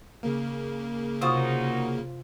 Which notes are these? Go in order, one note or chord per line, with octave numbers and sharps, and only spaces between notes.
C#3 A#3
C3 F#3 D#4 F4 C5 C#6 D#6